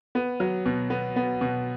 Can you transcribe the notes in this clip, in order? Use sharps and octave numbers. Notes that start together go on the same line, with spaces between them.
B3
F#3
B2
B3
B3
B2